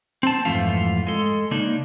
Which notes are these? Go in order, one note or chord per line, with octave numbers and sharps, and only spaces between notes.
C4 A5
F2 G#2 E3 A3 F4
G#3 A4
C#3 A#3 D4 D#4